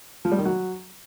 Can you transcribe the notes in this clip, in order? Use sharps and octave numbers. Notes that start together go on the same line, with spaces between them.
F3
G3
D#3
F#3